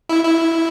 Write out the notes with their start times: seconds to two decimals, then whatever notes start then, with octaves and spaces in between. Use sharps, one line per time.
0.09 E4
0.24 E4